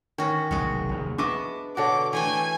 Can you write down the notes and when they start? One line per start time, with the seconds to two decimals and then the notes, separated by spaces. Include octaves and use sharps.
0.18 D#3 C#4 F#4
0.51 F1 B1 E2 G#3 F#4
0.89 F1 D#2
1.18 B3 D4 D#5 E5 C#6 D6
1.77 B2 D3 F#4 A4 C#5 D6
2.13 E3 A3 G5 G#5